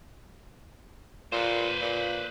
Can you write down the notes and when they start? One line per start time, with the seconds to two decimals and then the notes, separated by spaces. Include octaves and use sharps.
1.32 A#2 B4 C5
1.81 A#2